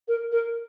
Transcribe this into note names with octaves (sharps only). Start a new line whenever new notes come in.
A#4
A#4